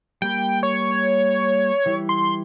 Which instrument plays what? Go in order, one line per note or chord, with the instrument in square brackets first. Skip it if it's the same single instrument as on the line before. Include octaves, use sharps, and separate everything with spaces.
[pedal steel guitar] G3 A#3 B5 [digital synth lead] G5
[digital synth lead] C#5
[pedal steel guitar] E3 G3 E4
[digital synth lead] C6